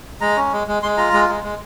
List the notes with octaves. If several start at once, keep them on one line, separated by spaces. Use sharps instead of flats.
G#3 A#5
C#4
G#3
G#3
G#3 C6
F4 A#5
G#3
G#3
G#3